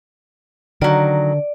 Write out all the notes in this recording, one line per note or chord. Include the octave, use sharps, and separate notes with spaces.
D3 D#3 F#3 D5